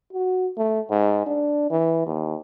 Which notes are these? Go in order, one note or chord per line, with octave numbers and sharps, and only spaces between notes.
F#4
A3
G#2
D4
E3
D#2